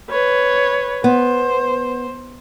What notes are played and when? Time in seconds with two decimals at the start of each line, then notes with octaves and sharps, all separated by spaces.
0.10 B4 C#5
1.04 B3 C5